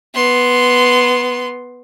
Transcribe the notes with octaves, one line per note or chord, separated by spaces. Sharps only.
B3 C6